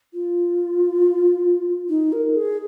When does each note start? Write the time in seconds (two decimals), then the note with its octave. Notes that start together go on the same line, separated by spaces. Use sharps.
0.13 F4
1.89 D#4
2.12 A#4
2.35 G#4